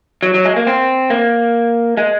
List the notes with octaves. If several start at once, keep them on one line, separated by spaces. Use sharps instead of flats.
F#3
F#3
G#3
A#3
C4
A#3
G#3